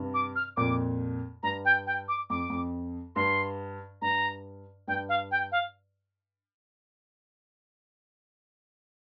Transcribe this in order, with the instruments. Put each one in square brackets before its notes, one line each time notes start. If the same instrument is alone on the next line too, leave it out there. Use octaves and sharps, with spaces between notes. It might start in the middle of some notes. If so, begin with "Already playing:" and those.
Already playing: [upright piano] G2 C3
[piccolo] D6
F6
[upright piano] F2 A#2 [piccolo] D6
[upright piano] G2 [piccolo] A#5
[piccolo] G5
G5
D6
[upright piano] F2 [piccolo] D6
[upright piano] F2
[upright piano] G2 [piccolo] C6
[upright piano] G2 [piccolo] A#5
[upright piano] G2 [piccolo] G5
[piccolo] F5
G5
F5